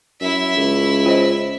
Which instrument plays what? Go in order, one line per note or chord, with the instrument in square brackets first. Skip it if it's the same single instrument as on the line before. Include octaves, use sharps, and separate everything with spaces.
[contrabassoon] F#2 [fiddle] E4 E5
[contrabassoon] C#2
[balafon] F4 C5 D#5